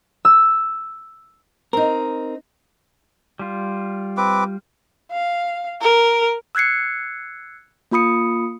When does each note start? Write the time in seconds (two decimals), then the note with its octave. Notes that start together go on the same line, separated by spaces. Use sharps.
0.25 E6
1.73 C4 D#4 A#4
3.39 G3 F4
4.17 C4 B4 D6
5.12 F5
5.81 A#4
6.55 E6 F#6 G#6 C7 C#7
7.91 A#3 F4 B5 D#6 C#7